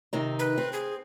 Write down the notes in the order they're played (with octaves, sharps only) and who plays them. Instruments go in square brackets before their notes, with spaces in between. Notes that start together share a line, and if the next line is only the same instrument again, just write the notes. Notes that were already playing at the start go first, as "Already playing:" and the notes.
[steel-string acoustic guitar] C3 D#3 D#4
[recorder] B4
[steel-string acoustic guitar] C4
[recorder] G#4